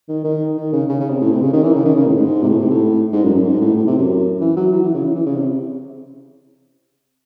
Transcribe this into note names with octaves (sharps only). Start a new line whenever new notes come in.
D#3
D#3
D#3
C#3
C#3
C#3
C3
A2
C3
C#3
D#3
E3
C#3
D#3
C#3
A2
G#2
C3
A2
C3
A2
G#2
F#2
F#2
G#2
A2
A2
C3
F#2
E3
F#3
E3
E3
C#3
E3
E3
C#3
C3